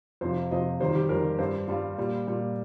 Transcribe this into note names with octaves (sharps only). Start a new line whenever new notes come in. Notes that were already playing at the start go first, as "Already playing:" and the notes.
F2 C3 F3 C5
F2 C3 F3 D#5
F2 D#3 G3 C5
G4
F2 D#3 G3 A#4
G2 G3 C5
G2 G3 F4
A#2 G3
A#2 G3